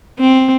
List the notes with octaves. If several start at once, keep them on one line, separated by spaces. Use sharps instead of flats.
C4